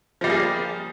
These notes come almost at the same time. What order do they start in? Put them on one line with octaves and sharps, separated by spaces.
F3 G3 A#3 G#4